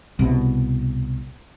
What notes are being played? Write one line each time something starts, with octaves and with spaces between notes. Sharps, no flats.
C2 B2